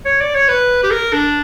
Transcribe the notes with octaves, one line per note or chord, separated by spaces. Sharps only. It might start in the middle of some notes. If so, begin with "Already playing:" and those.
C#5
D5
C#5
B4
G4
A#4
D4